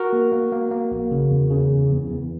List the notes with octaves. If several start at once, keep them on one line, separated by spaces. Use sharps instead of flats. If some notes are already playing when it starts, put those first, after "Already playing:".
Already playing: F#4 A#4
A#3
A#3
A#3
A#3
A#1
C#3
E2
C#3
E2
E2
E2